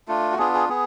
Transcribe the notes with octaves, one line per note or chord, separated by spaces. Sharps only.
A3 D4 F4
F#4
B3 D4 F4 G#4
G#4
B3 G#4